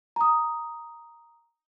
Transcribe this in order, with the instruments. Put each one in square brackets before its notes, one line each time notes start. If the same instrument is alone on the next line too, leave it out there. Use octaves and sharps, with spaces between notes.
[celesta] A#5 D#6